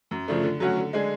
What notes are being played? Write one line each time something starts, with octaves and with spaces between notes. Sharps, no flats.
F#2
C#3 F3 A3 D4
D3
F#3 A3 C#4 F#4
D3
G#3 D4 G#4